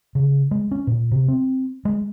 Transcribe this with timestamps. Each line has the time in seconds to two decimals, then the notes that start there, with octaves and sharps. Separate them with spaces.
0.15 C#3
0.51 G#3
0.71 C#4
0.87 A#2
1.12 C3
1.28 C4
1.85 G#3